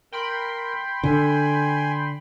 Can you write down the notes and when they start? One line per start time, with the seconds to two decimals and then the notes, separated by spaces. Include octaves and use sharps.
0.12 A#4 G5 B5 C6
1.04 D3 G#5